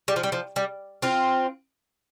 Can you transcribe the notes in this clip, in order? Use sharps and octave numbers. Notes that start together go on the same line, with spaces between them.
G3
F3
G3
F3
G3
C4 F4